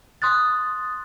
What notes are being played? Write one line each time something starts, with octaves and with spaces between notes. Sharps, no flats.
C6 D#6 F#6 A6